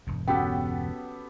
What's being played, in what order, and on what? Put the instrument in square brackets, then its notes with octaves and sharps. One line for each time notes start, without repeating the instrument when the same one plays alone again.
[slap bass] E1 G2
[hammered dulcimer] B3 G4 A4 [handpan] C#4 F#4 F#5 [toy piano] G5